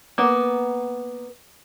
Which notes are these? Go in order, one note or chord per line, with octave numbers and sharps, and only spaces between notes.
A#3 B3